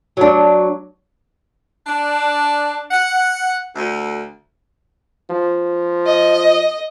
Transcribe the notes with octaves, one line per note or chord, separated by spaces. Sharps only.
F#3 D4
D4
F#5
D2
F3
D#5